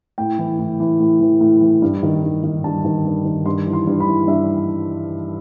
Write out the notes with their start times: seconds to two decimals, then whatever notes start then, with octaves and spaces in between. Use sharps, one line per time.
0.18 A2 G5
0.38 E3
0.59 A2
0.80 E3
1.00 A2
1.21 E3
1.41 A2
1.61 E3
1.82 G2
2.03 D#3
2.23 G2
2.43 D#3
2.64 G2 A5
2.84 D#3
3.05 G2
3.25 D#3
3.46 G2 C6
3.66 E3
3.73 C6
3.87 G2
4.00 B5
4.07 E3
4.28 G2 E5